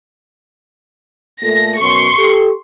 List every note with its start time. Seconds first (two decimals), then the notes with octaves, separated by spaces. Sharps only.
1.42 A#2 A3 A4 A#6
1.80 F#2 B2 F#3 C6 C#6
2.17 G4 A4